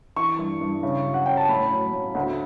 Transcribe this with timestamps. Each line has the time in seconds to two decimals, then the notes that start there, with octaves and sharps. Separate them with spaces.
0.16 E3 C#6
0.39 G2
0.61 G2
0.83 C#3
1.05 F#3
1.14 F#5
1.26 C#4 G5
1.37 A5
1.49 A2 B5
1.71 F#3
1.93 A2
2.15 D2